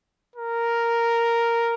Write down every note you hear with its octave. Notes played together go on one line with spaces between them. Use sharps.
A#4